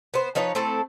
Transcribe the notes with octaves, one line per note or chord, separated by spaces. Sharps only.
B3 C5
F3 D#4 B4 C#5
A3 C4 E4 A4